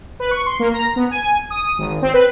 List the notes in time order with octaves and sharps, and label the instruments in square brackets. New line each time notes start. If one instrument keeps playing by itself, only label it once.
[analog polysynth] B4
C#6
C6
A#3
A#5
B3
G#5
D#6
G#1
C4
B4